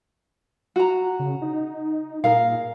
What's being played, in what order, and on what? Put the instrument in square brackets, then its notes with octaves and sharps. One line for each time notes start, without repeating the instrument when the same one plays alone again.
[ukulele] F#4 A#5
[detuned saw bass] C#3
D#4
[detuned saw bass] A#2 [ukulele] G#4 A#4 F5